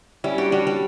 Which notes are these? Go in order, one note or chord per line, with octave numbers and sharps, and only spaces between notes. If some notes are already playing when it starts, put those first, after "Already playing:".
G3 C#4 E4
D4 F#4 G4
G3 D4 F#4
G3